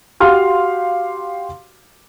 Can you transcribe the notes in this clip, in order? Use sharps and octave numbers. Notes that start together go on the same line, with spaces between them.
F#4 G4 F5 C6 F6